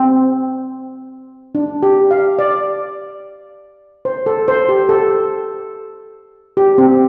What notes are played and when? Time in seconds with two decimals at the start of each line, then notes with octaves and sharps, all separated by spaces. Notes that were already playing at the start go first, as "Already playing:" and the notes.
Already playing: C4
1.55 D4
1.83 G4
2.11 F5
2.39 D5
4.05 C5
4.26 A4
4.48 C5
4.69 G4
4.89 A4
6.57 G4
6.78 C4